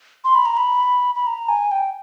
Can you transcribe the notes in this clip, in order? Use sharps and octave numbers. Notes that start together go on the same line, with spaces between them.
C6
B5
A#5
B5
B5
A#5
G#5
G5